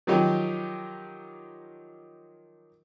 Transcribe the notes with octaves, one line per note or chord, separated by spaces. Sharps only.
D#3 F3 F#3 D#4 G4